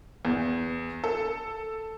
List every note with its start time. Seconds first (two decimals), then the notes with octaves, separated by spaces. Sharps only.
0.25 E2
1.04 A4